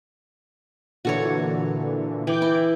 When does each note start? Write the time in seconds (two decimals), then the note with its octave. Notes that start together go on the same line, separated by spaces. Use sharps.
1.05 A#2 D3 E3 F#4 A4 C#5
2.27 E3 G5 D6 G6
2.42 E4